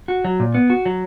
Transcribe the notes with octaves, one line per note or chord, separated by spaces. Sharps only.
F#4
F#3
A#2
B3
F#4
F#3